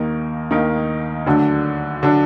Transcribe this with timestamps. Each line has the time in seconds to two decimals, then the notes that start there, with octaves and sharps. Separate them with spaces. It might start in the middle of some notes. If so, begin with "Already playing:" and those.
Already playing: D#2 D#3 A#3 D#4 A#4
0.51 D#2 D#3 A#3 D#4 A#4
1.26 D2 D3 F#3 D4
2.03 D3 F#3 D4